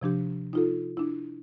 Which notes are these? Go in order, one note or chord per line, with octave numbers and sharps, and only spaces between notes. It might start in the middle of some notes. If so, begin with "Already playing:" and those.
C3 F3 D4 G4
D#4 F4 A4
D4 E4